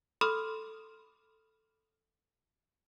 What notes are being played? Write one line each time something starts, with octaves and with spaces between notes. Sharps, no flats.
A4 B5 C6 D#6 F6